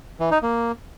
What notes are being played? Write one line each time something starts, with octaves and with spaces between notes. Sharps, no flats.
E3
D#4
A#3